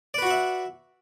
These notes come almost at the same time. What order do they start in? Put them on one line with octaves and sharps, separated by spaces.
D5 B4 F#4 F#5 E5